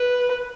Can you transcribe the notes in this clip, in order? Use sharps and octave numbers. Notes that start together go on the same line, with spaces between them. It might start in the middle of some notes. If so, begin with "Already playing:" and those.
Already playing: B4